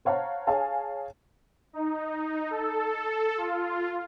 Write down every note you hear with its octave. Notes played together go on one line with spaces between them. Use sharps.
C5 C#5 F5 F#5 A5 A#5
G#4 C#5 F5 G#5 A5
D#4
A4
F4